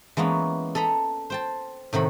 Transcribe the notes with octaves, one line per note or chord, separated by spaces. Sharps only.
E3 G#3 A#3 B3 C#4
A4 D#5 A#5 B5
C5 G5 A5
A2 C3 D#3 F#5 B5